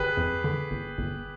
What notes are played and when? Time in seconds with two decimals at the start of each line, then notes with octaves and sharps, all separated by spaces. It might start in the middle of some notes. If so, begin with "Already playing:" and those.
Already playing: G1 G4 G#4 B4
0.17 F2
0.44 D3
0.71 G1
0.98 G1